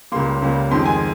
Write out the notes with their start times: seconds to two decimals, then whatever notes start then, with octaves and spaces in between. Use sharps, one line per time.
0.12 C#2 C#3 G3 A#3 C6
0.42 C#2 C#3 G3 A#3
0.71 F2 D#3 G#3 C6
0.86 G#5